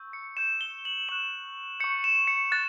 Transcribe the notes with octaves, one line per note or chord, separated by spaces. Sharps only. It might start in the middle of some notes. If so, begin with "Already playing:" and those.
Already playing: C#6 E6 G6
C#7
C#6 G6 E7
G7
F#7
C#6 F#6 E7
C#6 G6 C#7
E7
C#7
C#6 F#6 A6